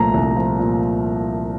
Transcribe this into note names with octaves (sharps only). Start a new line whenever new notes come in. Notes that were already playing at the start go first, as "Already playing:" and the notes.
Already playing: C2 A#2 F3 A3 A#5
C2
F3
A#2